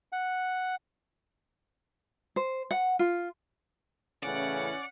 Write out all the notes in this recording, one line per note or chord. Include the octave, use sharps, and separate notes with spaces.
F#5
C5
F#5
F4
A2 C#3 E3 C#4 D5 F#5